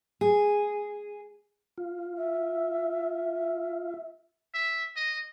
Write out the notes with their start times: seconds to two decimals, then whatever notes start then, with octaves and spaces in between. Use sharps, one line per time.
0.21 G#4
1.78 F4
2.17 E5
4.54 E5
4.96 D#5